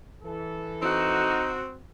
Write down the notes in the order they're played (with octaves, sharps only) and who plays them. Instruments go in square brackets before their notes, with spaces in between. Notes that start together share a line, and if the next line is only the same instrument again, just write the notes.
[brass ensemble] E3 A4
[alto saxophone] C4 [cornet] D#4 [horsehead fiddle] F#4